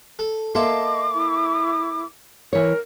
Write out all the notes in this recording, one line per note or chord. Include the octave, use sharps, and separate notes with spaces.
A4
A#3 A4 D#5 E5 A5 C6 D6
E4
E3 A#4 C#5